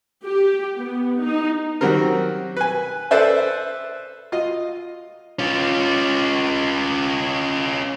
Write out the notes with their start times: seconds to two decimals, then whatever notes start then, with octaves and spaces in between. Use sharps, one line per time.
0.24 G4
0.80 B3
1.22 D#4
1.81 D#3 F#3 G3 C4 A#4
2.57 B4 G#5
3.11 A4 B4 C5 D5 E5
4.32 F4 D#5
5.39 C#4 F4